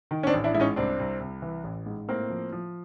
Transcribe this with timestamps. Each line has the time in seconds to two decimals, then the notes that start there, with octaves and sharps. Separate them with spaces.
0.11 D#3
0.23 C#4
0.27 C4 D4
0.34 A1
0.44 D4 E4
0.54 G#2 E4
0.60 C#4 D#4
0.76 C2 C4 D4
0.99 C2
1.20 C2
1.42 E3
1.64 A1
1.86 G#2
2.08 A2 A#3 C4
2.30 F3
2.52 F3